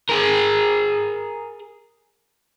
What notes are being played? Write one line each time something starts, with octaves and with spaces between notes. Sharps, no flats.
G#4 A#4